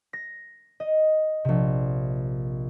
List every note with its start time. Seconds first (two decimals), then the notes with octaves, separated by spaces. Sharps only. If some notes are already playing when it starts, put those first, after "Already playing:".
0.13 A#6
0.80 D#5
1.45 A#1 C3